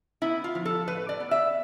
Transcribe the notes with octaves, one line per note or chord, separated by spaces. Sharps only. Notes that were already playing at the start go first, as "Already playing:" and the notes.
B3 E4
F4
F3
A4
A2 B4
D5
B3
E5